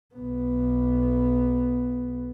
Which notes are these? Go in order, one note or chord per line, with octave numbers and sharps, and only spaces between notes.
B1 B3